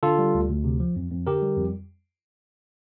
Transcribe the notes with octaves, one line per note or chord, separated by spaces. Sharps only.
D3 F4 A4
G3
D2
D2
C3
F3
F2
F2
D3 G4 A#4
G3
F2